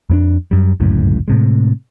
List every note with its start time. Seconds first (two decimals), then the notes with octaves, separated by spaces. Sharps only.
0.10 F2 A#3 D4
0.51 F#2 G3
0.80 G1 C#2 F#2 A2
1.28 A2 C3 G#3